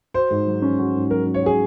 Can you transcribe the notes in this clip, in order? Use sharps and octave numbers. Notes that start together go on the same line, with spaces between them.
F#4 C5
G#2
F#3
C#4
F#4
G#2
F#3 A#4
C#4
C#5
F#4 G#4